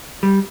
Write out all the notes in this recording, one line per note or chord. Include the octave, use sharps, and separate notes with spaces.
G3